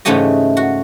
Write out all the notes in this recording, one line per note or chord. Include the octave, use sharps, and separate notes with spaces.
G#2 C#3 E3 A3 G4 D#5
F#4